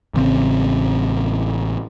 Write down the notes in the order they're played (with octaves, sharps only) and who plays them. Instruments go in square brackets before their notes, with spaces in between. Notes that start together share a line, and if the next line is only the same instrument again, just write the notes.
[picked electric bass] A1 C#3 C4